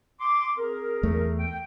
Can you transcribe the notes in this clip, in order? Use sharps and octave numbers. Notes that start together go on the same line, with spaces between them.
C6 D6
C4 G#4 A#4
E2 A3
G5